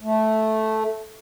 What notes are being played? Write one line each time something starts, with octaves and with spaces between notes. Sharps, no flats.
A3